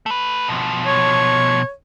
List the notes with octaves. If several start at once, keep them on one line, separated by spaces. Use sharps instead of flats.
A3 B4
B2 F3
C#5